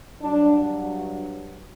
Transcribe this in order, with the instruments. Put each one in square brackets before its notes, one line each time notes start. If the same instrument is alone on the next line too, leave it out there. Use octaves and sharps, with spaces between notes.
[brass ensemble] G2 F#3 D4